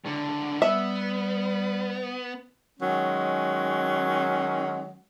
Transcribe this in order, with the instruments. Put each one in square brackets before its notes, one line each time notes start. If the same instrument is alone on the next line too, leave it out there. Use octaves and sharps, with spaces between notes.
[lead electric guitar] C#2 D3
[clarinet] G3 [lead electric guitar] B3 [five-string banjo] E5
[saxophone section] D#3 F#3 G#3 C#4